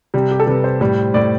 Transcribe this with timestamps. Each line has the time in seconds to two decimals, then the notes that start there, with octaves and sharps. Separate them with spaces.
0.14 C3 G3
0.31 G4
0.40 A4
0.47 C3 G3 B4
0.64 C5
0.81 A2 G3
1.14 A2 G3 D5